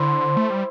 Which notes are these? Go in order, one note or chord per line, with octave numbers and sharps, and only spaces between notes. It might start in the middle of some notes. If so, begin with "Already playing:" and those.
Already playing: D3 E4 C5 E5
A3
G3